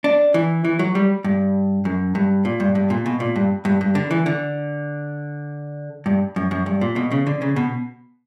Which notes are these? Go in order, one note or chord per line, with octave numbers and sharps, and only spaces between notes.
D4
E3
E3
F#3
G3
G2
F#2
G2
A#2
G2
G2
A#2
B2
A#2
G2
G2
G2
D3
E3
D3
G2
F#2
F#2
G2
A#2
B2
C#3
D3
C#3
B2